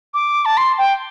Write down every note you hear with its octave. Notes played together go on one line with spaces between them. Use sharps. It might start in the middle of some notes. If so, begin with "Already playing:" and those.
D6
A5
C6
G5